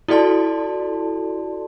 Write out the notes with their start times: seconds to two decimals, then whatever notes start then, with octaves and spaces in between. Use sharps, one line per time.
0.08 E4 F#4 A4 D5 A5 C6